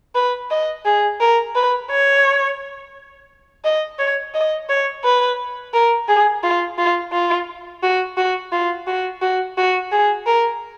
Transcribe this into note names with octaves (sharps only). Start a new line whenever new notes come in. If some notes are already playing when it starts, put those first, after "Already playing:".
B4
D#5
G#4
A#4
B4
C#5
D#5
C#5
D#5
C#5
B4
A#4
G#4
F4
F4
F4
F#4
F#4
F4
F#4
F#4
F#4
G#4
A#4